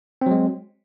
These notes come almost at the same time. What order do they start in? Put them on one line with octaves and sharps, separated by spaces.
C4 F#3 G#3